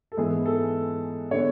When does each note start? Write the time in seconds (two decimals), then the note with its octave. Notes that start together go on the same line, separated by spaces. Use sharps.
0.12 A4
0.17 G#2 E3 B3 G#4
0.46 A4
1.31 D3 G#3 B3 C#5